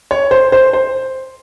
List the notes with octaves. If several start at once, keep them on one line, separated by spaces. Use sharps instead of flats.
C#5
C5
C5
C5